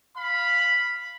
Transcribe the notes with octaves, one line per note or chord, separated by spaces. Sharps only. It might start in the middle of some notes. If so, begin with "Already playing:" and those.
F5 B5